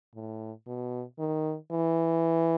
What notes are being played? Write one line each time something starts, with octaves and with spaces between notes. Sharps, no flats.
A2
B2
D#3
E3